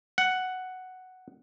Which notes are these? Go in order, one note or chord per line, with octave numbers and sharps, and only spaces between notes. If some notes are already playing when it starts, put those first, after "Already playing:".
F#5